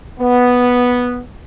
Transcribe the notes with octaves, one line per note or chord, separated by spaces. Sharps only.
B3